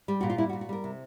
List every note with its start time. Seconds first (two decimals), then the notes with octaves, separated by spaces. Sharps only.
0.08 G3
0.21 A#2 F#4
0.30 F4
0.38 G3 E4
0.49 F#4
0.53 A#2
0.61 F#4
0.69 G3 A#4
0.84 C3